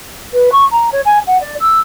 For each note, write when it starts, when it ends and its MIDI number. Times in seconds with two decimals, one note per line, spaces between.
0.33 0.52 71
0.52 0.64 85
0.72 0.89 82
0.92 1.01 73
1.05 1.19 80
1.27 1.38 78
1.41 1.55 74
1.61 1.79 88